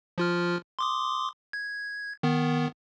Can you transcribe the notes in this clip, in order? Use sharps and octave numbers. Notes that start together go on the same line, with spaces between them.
F3 F4 F6
C6 D6 D#6
G#6
D#3 B3